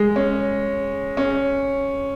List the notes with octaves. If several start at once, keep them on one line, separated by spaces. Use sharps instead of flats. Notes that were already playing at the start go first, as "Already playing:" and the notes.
Already playing: G#3
C#4
C#4